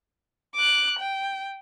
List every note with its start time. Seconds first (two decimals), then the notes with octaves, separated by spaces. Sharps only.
0.55 D6 F#6
0.99 G5